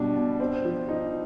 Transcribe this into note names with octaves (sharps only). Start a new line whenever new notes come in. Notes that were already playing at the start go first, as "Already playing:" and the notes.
Already playing: B2 G3 D4
B2
C4
F3
D#4